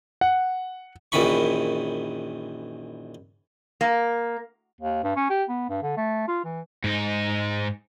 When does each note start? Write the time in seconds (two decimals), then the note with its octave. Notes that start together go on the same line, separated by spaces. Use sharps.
0.21 F#5
1.12 A#1 F#2 D#3 E3 B5 C#6
3.81 A#3
4.81 D#2
5.04 G2
5.16 C#4
5.30 G4
5.49 B3
5.70 G2
5.83 D3
5.97 A3
6.28 F4
6.45 E3
6.84 G#2 D#4